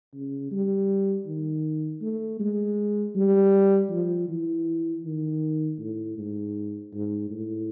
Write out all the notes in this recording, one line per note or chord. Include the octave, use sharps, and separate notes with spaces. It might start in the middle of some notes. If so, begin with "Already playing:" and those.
C#3
G3
D#3
A3
G#3
G3
F3
E3
D#3
A2
G#2
G#2
A2